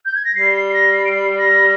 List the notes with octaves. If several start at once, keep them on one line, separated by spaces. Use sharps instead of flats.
G6
G#6
A#6
G3 C7
C7
C7
A#6
C7
D7
C7
A#6